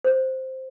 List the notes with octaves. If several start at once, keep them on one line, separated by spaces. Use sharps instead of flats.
C5